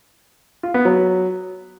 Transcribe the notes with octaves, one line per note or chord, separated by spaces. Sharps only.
F4
B3
F#3